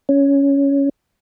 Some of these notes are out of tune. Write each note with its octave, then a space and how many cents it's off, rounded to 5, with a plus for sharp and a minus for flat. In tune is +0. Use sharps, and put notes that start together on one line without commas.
C#4 +10